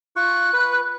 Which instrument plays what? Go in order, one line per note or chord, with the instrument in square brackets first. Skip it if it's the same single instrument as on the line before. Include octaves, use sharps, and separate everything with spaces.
[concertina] F4 C#6 [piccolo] F#6
[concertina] B4